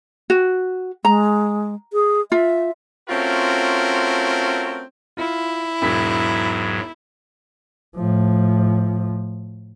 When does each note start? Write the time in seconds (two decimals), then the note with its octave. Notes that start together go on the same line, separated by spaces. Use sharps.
0.30 F#4
1.05 G#3 A#5
1.93 G#4
2.32 F4 E5
3.09 A3 C4 C#4 F4 F#4 A#4
5.17 E4 F4
5.82 E1 G#2 F#3 B6
7.97 A2 F3